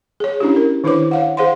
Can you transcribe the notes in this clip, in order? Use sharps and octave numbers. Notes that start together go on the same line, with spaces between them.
G#4 C#5
C#4 D4 E4 G4
A#4
D#3 D4 E4 B4 C#5 D6
C#5 F5 F#5
G#4 C5 F5 F#5 C6